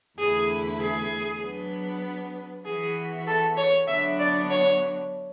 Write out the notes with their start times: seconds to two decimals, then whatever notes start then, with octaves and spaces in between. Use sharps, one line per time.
0.19 E2 D3 A3 E4 G#4 B4
0.80 G#4
1.42 F#3 B3 D4
2.65 E3 B3 F#4 G#4
3.27 A4
3.57 C#5
3.87 D3 F#3 B3 D4 F#4 E5
4.19 D5
4.50 C#5